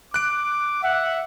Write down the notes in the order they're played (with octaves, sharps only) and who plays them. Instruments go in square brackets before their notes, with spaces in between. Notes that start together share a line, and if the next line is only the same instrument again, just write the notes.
[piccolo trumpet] D6 [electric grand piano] F#6 D7
[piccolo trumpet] E5 [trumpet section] F#5